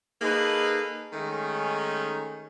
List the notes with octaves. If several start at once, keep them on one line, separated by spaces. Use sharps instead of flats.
A#3 D#4 G#4 A4 B4
D#3 G#3 A3 C#4 D#4